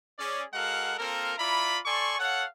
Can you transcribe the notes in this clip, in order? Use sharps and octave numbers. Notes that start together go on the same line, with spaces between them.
C#4 G#4 D5
G#3 F#4 A4 A#4 F5 F#5
A#3 C4 F4 A4 A#4
E4 F4 D5 A#5 B5
A4 D5 G#5 C6 C#6
A4 C#5 F5 F#5